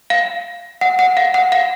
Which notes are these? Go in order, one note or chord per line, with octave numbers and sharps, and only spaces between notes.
F5
F#5
F#5
F5
F#5
F5